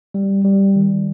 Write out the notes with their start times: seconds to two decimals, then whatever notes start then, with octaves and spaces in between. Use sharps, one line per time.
0.14 G3
0.44 G3
0.76 D#3